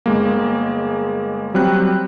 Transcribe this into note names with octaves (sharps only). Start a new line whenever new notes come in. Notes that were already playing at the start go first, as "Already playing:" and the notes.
G1 G#3 A#3
F#3 G3 C4 F#6